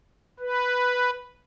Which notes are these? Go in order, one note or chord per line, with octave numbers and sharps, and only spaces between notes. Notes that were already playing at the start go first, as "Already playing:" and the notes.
B4